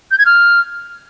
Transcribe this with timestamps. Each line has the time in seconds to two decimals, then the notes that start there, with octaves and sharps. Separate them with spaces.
0.11 G6
0.18 G#6
0.26 F6